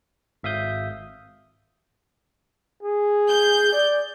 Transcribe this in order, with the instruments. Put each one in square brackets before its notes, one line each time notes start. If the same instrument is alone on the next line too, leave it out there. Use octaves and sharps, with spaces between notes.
[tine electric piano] G#1 E5 F5 D#6 G6
[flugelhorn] G#4
[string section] G6
[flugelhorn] D5